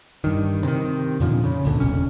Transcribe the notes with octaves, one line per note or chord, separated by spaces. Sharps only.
G2 D#3
C3 D#3
F2 A#2 D3 F3
C#3
C#2 A#2 D3
E1 B1 C#4